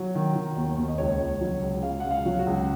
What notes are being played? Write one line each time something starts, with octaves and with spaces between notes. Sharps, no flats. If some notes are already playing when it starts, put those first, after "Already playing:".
Already playing: F#3
D#3
D#3
D#2
D#2
D#5
C#2 C#5
C#2
F#3
C#2
C#2 F5
C#2 F#5
F5
F#3
F#4
C#2